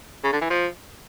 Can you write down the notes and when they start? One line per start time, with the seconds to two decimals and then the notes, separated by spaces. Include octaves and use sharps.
0.24 C#3
0.33 D3
0.41 E3
0.50 F3